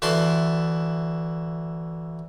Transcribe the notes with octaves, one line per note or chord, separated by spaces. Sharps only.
D2 E3 E4 A5 C6